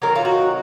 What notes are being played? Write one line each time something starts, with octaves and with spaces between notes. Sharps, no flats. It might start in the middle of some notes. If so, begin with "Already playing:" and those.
D#3 F#3 C4 D#4 A#4
F4
F#4